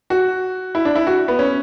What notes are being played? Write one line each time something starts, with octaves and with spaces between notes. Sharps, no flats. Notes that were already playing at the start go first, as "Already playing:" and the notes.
F#4
E4
D4
E4
F#4
B3
C#4